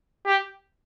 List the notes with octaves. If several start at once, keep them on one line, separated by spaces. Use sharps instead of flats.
G4